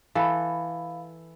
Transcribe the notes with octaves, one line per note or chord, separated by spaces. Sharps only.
E3 A4 F5 B5